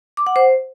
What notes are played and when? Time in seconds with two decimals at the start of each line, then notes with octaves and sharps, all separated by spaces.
0.17 D6
0.27 F#5
0.36 C5